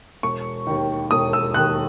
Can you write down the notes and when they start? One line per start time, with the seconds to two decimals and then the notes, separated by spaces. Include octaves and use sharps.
0.23 E1 C#6
0.67 D#2 D#3
1.11 E1 D#6
1.33 E6
1.54 D#2 D#3 F#6